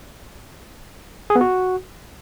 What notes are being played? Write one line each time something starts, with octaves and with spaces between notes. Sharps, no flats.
G#4
B3
F#4